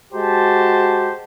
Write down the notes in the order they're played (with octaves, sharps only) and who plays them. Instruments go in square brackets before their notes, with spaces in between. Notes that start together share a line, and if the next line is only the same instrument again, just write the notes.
[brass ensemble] G#3 F#4 G4 C5 A5